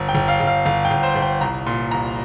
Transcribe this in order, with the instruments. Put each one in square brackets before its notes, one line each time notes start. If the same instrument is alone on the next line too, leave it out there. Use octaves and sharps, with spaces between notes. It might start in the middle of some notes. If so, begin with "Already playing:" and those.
Already playing: [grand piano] G1
G5
G1
F5
G1
F5
G1 F5
G5
G1
C5
G1
G5
C2 A#5
A#2 C6
C2 A#5